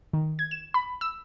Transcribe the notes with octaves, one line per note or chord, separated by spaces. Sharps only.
D#3
G#6
E7
B5
E6